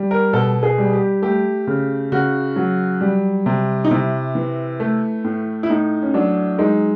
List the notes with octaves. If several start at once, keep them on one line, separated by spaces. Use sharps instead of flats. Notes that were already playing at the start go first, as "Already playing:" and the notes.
Already playing: G3
A#4
B2 A4
G#4
G3
G4
A3 G4
C#3
C#3 F#4
F#3
G3
C3
D#4
C3 E4
E3
A3
A2
E4
A2 D#4
C#4
F#3 D4
G#3 D#4